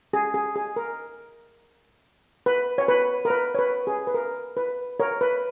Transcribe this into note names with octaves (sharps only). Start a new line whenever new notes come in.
G#4
G#4
G#4
A#4
B4
C#5
B4
A#4
B4
C#5
B4
G#4
B4
A#4
B4
A#4 C#5
B4